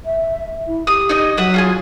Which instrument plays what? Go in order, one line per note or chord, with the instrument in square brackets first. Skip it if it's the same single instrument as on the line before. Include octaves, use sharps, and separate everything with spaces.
[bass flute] E5
E4
[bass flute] G4 [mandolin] D#6
[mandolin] D#4 C#5 D#5
[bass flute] F#3 [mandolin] E5 F#5 D#6
[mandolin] F4 G#4 G#5